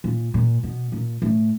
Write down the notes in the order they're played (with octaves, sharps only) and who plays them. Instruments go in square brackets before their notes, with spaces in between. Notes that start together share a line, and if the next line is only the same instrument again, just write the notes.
[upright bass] A#2
A#2
B2
A#2
A2